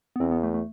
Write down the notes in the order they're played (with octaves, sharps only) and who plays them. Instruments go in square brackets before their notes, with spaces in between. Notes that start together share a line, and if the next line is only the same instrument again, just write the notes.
[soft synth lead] B3
[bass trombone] E2 [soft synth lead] C4
[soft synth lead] B3
A3
A3